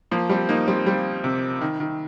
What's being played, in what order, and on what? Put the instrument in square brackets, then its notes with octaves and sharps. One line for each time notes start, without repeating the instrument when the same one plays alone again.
[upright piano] F3 A#3
G3 C4
A#3 D#4
G3 C4
G3 C4
C3
D#3
D#3